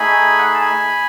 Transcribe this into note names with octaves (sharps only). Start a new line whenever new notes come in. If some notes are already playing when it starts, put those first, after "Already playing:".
Already playing: A3 D#4 G#4 G#5 B5
F#5
G#5
A5
G#5 B5